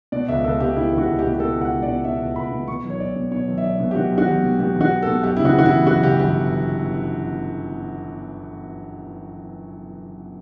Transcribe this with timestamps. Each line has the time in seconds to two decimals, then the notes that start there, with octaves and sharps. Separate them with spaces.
0.12 B2 D5
0.28 C#2 E5
0.44 C#2 A4
0.60 B2 G4
0.76 B2 E4
0.92 C#2
0.98 F#4
1.08 C#2
1.19 G4
1.24 B2
1.33 G4
1.40 B2 A4
1.56 C#2
1.61 F#5
1.72 C#2
1.83 D5
1.88 B2
2.04 B2 E5
2.20 C#2
2.36 C#2 B5
2.52 B2
2.68 B2 C#6
2.84 B1
2.90 C#5
3.00 B1 D5
3.16 B2
3.31 B2 C#5
3.48 B1
3.58 E5
3.63 B1 D5
3.80 B2
3.91 G4
3.96 B2 F#4
4.12 B1
4.18 F#4
4.28 B1 G4
4.44 B2
4.59 B2 G4
4.76 B1
4.81 F#4
4.92 B1
5.03 B2 A4
5.24 F#2 G4
5.37 E4
5.39 C#3
5.45 F#4
5.56 G1 F#4
5.66 E4
5.72 E3
5.87 F#2 F#4
6.03 C#3 G4
6.19 G1 G4